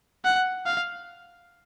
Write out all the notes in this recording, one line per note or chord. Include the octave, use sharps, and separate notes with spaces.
F#5
F5